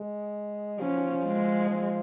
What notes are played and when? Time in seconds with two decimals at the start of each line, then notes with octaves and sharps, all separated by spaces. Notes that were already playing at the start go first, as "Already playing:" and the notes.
Already playing: G#3
0.80 F3 C#4
1.24 G#3
1.70 F3